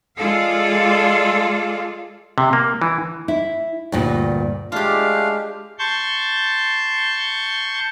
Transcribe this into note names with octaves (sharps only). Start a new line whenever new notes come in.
G#3 F4 G#4 A4 D5 F5
C3
A#3
E3
E4
D2 G2 A#2
G#3 A3 D4 F4 G4 F5
A5 C6 C#6 G6